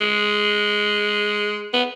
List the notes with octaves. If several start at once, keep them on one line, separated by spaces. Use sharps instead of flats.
G#3
B3